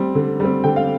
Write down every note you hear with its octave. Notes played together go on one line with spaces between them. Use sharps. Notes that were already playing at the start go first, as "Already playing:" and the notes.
Already playing: G3 C4
D3
G3 C4
D3 G5
F5